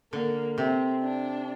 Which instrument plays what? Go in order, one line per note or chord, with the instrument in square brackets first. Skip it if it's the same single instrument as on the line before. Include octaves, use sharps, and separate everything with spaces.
[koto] D3 [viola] A#3
[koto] C3 [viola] C4
[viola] D4